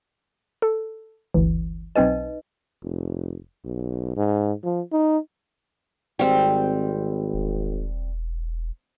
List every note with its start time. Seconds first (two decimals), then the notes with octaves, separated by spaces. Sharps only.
0.62 A4
1.34 G1 D2 E3
1.96 B1 C4 D#4 B4 D#5 G#5
2.83 F1
3.64 B1
4.17 G#2
4.64 F3
4.92 D#4
6.19 G#1 G3 C4
7.34 E1